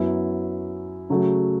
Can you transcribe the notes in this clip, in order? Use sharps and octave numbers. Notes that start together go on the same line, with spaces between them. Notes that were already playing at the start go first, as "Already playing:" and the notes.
Already playing: F#2 F#3 B3 E4
C#3 F#3 A3 F#4